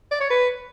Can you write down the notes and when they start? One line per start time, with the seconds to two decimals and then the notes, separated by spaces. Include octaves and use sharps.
0.11 D5
0.21 C#5
0.31 B4